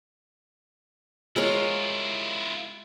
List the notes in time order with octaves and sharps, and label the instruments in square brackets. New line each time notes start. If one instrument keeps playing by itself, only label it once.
[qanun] G#3 A#4 C#5 [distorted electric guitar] E4 F4